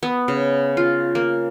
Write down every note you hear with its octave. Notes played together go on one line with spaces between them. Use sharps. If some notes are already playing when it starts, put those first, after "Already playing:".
B3
C#3
F4
A#3